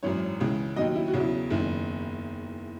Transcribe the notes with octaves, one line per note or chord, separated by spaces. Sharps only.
G#1 F#2 E3 C#5
C#2 C#3 E3
D#2 D#3 F#3 D#5
E4
F#4
E2 C#3 F#3
E4
F#1 E2 D#3 E4